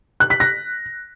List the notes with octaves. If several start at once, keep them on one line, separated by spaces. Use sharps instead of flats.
F#6
B6
A#6